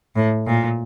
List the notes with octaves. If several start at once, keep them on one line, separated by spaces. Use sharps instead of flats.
A2
A#2